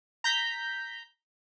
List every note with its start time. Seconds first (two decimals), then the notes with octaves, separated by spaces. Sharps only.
0.24 A#5 G6 B6